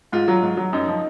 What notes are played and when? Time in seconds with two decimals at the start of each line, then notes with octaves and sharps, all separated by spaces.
0.12 G#2 F4
0.28 F#3
0.42 G#2
0.57 F#3
0.73 F#2 D#4
0.88 F3